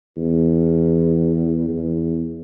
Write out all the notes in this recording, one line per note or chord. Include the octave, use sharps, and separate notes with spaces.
E2
E2